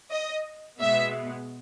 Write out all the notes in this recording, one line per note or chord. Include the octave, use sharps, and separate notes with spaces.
D#5
B2 G#3 B3 E5